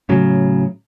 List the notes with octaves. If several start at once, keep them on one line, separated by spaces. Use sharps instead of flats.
A2 C#3 F#3